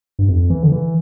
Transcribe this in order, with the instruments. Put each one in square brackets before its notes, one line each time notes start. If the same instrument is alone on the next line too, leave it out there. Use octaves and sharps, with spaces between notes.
[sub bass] G2
F2
E3
D3
E3